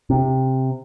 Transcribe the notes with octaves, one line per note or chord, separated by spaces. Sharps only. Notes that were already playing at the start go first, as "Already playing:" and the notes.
C3